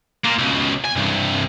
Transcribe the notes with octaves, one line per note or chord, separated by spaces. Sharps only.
A#3 F4
C#2 B2
G#5
C2 G2